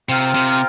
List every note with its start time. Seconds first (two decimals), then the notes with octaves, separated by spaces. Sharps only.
0.09 C3 C4 F4 A#4
0.35 C3